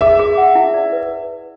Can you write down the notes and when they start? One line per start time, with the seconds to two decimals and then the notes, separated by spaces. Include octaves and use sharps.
0.01 G#4 E5
0.19 G#4
0.38 F#5
0.55 E4
0.74 D5
0.92 B4